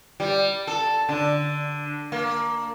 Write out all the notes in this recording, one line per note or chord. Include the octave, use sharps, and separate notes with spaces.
G3
A4
D3
A#3